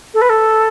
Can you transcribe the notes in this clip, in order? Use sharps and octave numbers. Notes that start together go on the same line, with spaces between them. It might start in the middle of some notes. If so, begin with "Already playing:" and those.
A4
B4
A4